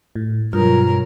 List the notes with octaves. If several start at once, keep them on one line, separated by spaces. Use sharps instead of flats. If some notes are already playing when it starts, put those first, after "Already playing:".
A2
G2 B2 F#3 F4 A#4